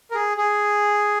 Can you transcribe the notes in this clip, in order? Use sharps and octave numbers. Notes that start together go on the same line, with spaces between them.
A#4
G#4
G#4